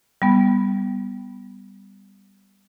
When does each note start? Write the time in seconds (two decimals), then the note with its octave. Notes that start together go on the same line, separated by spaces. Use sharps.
0.22 G3 B3